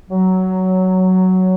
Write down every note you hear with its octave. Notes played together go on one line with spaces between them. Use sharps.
F#3